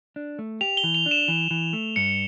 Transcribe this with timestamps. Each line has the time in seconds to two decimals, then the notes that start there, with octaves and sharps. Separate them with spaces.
0.16 D4
0.39 A3
0.61 G4 F7
0.77 G7
0.84 E3
0.94 F7
1.06 D4
1.11 E7
1.28 E3
1.51 E3
1.73 A3
1.96 G2 C#7